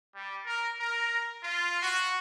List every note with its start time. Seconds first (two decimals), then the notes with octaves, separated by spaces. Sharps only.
0.15 G3
0.45 A#4
0.80 A#4
1.44 F4
1.82 F#4